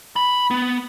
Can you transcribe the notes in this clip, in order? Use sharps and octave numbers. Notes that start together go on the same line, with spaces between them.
B5
B3